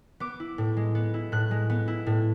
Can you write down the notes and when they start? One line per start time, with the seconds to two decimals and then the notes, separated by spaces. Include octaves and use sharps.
0.20 B3 D6
0.40 E4
0.58 A2
0.77 G#3
0.95 B3
1.14 E4
1.32 A2 F#6
1.51 G#3
1.70 B3
1.88 E4
2.07 A2